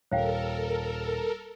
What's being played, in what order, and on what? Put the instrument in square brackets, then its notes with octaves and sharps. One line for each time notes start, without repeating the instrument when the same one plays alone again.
[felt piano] D#1 [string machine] A4 A#4 [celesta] C#5 F5 G5